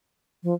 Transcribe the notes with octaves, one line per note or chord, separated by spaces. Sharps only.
F3